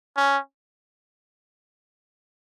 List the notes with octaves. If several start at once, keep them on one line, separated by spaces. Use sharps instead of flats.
C#4